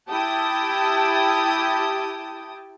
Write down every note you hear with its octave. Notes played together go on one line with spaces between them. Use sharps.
E4 G4 G5 A5 D#6